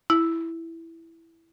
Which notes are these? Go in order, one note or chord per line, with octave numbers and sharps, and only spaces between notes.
E4